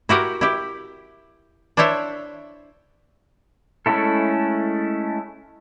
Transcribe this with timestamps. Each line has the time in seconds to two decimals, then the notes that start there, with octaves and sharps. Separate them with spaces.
0.09 E4 F#4 G4 A#4
0.41 E4 G4
1.77 D4 E4 C5 C#5 E5
3.86 G#3 A3 C#4 E4 A4